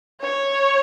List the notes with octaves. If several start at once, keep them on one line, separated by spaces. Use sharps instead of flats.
C#5